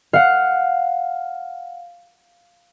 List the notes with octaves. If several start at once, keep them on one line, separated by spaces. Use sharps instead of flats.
F5 F#5